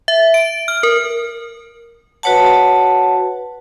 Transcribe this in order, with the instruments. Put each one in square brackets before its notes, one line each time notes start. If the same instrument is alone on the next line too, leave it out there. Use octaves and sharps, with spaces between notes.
[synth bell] E5
D7
F6
A#4
[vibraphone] F#4 B4 C#5 F#5 A5